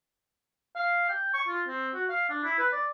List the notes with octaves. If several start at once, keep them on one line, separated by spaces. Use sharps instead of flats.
F5
G5
C#6
F4
C4
F#4
F5
D4
E4
B4
D5